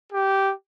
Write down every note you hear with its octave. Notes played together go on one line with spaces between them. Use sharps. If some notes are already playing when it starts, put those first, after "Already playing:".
G4